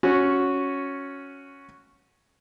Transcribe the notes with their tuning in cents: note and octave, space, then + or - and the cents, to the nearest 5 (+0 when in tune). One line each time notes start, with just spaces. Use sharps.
C#4 +0 F#4 -10